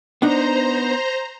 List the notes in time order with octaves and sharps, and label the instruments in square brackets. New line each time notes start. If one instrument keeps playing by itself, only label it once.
[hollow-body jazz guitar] B3 D4 D#4 [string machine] C5 A#5